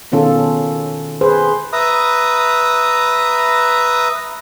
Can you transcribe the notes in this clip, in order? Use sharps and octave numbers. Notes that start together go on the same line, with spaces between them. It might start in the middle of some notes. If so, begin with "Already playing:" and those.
B2 D#3 C#4 F4 A4
G#4 B4 C5
B4 E5 A#5 D#6